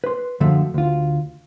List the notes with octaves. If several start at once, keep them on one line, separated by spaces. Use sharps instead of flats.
B4 C6
F#2 D3 F3 A3 E5
D2 F4